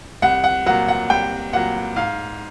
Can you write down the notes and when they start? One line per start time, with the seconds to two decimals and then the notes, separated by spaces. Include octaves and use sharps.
0.22 C2 F#5
0.44 F#5
0.66 A#2 F#3 F#5
0.88 F#5
1.10 C2 G5
1.53 A#2 F#3 F#5
1.96 G#2 F5